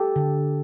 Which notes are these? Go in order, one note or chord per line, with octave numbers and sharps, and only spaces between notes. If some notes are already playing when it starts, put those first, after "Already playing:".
Already playing: G4 A4
D3